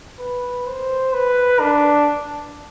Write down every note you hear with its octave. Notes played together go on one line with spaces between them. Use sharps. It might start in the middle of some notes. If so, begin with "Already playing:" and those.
B4
C5
B4
D4